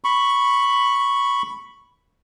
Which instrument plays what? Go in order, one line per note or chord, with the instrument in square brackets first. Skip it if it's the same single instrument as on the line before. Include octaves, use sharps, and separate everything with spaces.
[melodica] B5 C#6